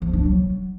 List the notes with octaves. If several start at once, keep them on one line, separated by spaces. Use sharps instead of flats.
F3
D4
F#3